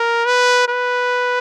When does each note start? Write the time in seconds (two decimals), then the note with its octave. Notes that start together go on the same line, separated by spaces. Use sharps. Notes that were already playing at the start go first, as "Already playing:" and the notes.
Already playing: A#4
0.26 B4
0.68 B4